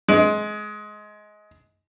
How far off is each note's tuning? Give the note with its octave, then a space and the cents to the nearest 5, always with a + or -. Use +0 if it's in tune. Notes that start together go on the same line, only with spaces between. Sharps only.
G#3 +20